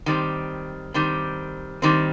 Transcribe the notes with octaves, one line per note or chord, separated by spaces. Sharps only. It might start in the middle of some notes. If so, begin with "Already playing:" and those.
D#3 G3 C4
D#3 G3 C4
D#3 G3 C4